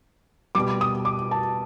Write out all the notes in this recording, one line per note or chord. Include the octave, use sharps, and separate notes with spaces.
B2 G3 D6
D#6
D6
A5